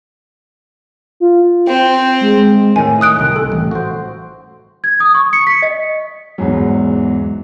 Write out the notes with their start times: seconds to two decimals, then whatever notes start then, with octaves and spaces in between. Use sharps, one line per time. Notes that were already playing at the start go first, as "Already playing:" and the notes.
1.20 F4
1.67 C4 G5
2.21 G#3
2.76 A2 D#3 G#5
3.01 D#6 F#6 D7
3.19 C2 D#3
3.36 A4
3.52 A1
3.71 F#4 C5
4.84 G#6
5.00 D#6
5.15 C#6
5.33 C#7
5.47 B6
5.62 D#5
6.38 E2 G#2 F#3